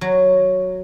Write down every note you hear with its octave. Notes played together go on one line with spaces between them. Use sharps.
F#3